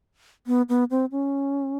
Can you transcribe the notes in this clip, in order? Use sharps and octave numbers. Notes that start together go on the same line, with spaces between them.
B3
B3
C4
C#4